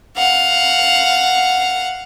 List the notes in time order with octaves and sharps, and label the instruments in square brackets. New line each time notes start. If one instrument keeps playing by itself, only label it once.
[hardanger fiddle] F5 F#5